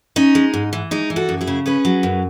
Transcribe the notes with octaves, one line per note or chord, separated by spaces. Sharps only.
C#4 D#4
G#3
G#2
E3
G#3 D#4
E3
F#4 A4
F#2
E4 G#4
C#3
C#4 G#4 B4
F#3
F#2